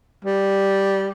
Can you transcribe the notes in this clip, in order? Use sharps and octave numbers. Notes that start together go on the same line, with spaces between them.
G3